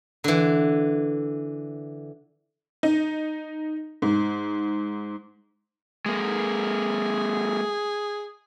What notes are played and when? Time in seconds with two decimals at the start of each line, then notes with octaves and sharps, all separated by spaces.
0.24 D3 E3
2.83 D#4
4.02 G#2
6.06 G#3 A#3 G#4